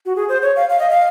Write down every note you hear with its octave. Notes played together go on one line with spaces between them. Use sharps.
F#4
G#4
C5
C#5
F5
F5
D#5
F5